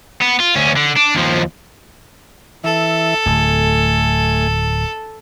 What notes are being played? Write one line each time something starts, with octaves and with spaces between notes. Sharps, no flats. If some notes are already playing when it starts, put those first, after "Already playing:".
B3
F4
D2 C#4
D3
D4
D#2 F3
E3 A4 E5
D1 A3 G#5